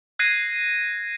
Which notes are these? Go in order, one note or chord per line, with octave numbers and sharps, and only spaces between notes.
F#6 G#6 A#6 C7 D#7